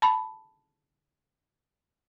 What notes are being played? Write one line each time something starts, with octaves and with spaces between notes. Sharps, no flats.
A5 B5